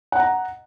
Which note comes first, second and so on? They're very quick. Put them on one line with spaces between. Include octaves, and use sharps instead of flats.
F#5 D#5 A#5